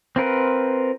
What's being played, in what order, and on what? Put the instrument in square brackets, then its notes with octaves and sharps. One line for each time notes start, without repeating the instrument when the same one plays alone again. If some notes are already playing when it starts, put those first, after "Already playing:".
[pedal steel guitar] C4 F4 A#4 B4